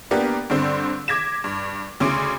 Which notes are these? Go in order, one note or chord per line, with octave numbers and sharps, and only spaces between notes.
A#3 B3 D4 G4
G2 D3 C4
D6 G#6 A#6 B6 E7
G2
D2 C#3 C#4 C6 D6 D7